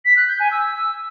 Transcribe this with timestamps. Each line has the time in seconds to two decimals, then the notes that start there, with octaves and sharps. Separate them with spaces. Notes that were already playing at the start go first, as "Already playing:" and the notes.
0.05 B6
0.16 F#6
0.28 G6
0.39 G#5
0.51 E6